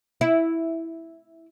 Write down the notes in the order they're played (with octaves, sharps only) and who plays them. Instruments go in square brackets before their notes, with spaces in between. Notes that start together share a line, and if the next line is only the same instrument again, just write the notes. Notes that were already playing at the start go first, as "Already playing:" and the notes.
[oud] E4